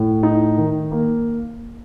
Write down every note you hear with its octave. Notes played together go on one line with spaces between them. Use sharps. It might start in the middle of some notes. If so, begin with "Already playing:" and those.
Already playing: A2
D#4
D#3
A#3